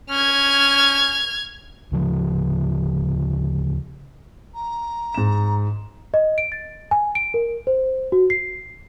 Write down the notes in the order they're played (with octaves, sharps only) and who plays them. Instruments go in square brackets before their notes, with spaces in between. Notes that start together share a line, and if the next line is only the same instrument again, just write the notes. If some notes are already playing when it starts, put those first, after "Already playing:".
[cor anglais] C#4 [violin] F6 G#6
[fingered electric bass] D2 C#3 F3
[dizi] A#5
[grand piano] G#2 E7
[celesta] D#5
D7
A6
G#5
D7
A#4
C5
F#4
C7